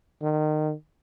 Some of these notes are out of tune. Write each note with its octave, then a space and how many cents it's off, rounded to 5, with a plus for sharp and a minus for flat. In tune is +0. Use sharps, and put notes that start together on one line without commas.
D#3 -25